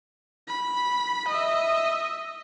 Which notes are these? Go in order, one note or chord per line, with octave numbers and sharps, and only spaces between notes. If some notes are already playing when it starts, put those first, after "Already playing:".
B5
D#5 E5